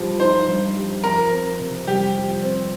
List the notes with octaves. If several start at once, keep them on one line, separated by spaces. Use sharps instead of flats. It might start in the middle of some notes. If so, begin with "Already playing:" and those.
Already playing: G2 F3 G4
D#4 C5
G2
G4
F2 A#4
C4
C3
G3 G4
F2
C4